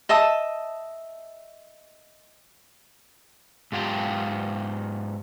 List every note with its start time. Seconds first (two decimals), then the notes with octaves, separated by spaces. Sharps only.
0.09 D#5 E5 A5 D#6
3.72 G#2 F4 G4 G5